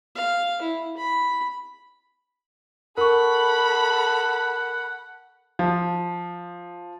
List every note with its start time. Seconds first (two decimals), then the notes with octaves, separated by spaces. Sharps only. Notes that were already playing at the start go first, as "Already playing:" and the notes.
0.16 F5
0.62 E4
0.97 B5
2.97 A4 A#4 F#5 B5 C#6
5.59 F3